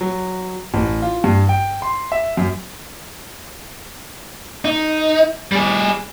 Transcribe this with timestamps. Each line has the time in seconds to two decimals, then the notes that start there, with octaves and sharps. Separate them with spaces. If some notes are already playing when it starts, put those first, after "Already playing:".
0.01 F#3
0.74 A1
1.02 F4
1.24 G2
1.49 G5
1.82 C6
2.12 E5
2.37 F#2
4.65 D#4
5.52 G3 G#4